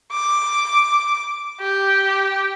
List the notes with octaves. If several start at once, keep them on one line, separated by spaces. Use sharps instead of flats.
D6
G4